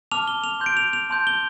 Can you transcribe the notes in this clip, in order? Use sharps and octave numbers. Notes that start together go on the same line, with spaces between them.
A5 D6 F6 F7
G7
F7
C6 G6
D7
F7
F7
A5 C6 G6
G7